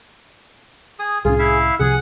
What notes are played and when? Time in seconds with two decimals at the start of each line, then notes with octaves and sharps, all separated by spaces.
0.99 G#4 D#6
1.25 C2 A2 C#4 F4 G#4
1.39 E4 E5 F5
1.79 C2 C3 F3 G#4 F#5